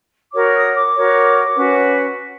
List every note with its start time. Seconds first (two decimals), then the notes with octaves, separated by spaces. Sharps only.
0.33 F#4 A#4 C#5 D6
0.54 D#6
0.74 D6
0.94 F#4 A#4 C#5
1.55 C#4 F#4 B4